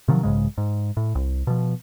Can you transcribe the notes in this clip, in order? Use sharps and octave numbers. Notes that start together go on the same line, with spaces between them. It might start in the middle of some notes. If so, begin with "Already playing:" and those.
C3 D#3 F3 F#3
B1 G#2 C#3 G#3
G#2
A2
C2
B2 F3